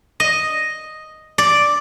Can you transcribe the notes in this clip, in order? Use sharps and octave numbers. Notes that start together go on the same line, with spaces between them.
D#5
D5